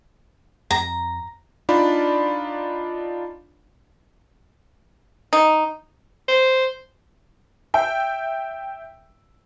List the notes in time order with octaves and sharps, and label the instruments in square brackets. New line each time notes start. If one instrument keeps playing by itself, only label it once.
[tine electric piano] F2 A#6 [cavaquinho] A#5
[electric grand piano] D4 D#4 F4 D5 B5
[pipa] D#4
[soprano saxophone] C5
[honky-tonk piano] E5 G5